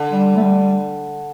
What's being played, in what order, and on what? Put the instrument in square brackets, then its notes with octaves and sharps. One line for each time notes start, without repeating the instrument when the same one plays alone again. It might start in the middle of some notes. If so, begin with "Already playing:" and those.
Already playing: [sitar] D3
[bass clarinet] G3
A3
G3